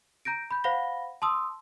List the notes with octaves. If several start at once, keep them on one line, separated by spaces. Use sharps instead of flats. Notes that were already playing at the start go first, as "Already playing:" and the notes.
A#5 G6 A#6 D7
B5 G6
C5 F5 F#5 B5 A#6 G7
A5 C6 D#6 E6